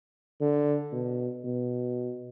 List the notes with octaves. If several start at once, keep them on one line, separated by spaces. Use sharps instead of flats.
D3
B2
B2